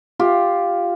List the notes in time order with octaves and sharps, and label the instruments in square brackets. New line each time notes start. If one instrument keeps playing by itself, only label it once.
[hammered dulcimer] F4 G4